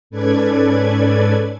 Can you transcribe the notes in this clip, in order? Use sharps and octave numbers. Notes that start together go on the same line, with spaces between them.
G#2 C#4 A4 B4 D5 G#6